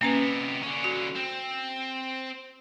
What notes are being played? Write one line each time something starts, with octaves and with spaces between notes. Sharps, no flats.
C3 A#3 B3 C#4 B4
D3 C#4
F#4
C4